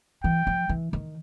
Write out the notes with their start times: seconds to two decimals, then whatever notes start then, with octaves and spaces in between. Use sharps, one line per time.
0.23 E3 G5
0.47 F3
0.69 E3
0.93 D#3